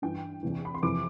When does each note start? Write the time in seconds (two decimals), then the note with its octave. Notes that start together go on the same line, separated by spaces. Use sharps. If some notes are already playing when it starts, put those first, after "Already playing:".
0.02 G2 E3 G5
0.43 E2 C3 E3
0.65 B5
0.75 C6
0.83 F2 C3 E3 D6